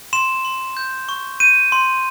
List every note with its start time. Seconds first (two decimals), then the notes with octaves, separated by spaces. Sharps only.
0.13 C6 E7
0.45 C6
0.77 G6
1.09 C#6
1.40 G6 D#7
1.72 C6